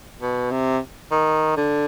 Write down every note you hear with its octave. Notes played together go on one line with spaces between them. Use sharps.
B2
C3
D#3
D3